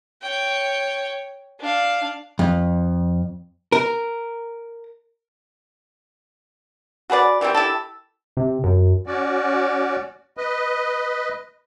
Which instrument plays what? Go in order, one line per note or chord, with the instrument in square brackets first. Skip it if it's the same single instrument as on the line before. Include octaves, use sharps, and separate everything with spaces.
[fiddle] C#5 G5
D4 F5
[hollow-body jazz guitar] F2
A#4
[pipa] F#4 G#4 B4 D5
E3 G3 A#3 C4
E4 G4 A4
[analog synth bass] C3
F#2
[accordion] C#4 F#4 D5
B4 D#5